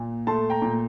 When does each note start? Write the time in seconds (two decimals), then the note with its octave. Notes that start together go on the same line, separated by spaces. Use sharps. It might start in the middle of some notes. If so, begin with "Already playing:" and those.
Already playing: A#2
0.27 A3 A5 C6
0.50 G5 A#5
0.62 A#2